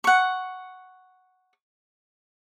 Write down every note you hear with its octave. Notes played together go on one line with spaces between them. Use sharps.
F#5 C#6